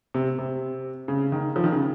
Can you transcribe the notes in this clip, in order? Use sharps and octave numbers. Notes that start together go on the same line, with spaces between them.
C3
C3
C#3
D#3
F3
D#3
C#3